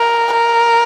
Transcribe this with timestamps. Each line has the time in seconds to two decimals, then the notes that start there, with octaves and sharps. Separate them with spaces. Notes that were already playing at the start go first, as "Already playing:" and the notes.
Already playing: A#4
0.33 A#4